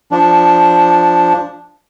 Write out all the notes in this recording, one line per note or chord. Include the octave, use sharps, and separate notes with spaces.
F3 D4